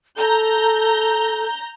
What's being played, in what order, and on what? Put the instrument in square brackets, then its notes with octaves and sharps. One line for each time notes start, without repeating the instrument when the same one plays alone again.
[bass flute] A4 [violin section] A#5 G6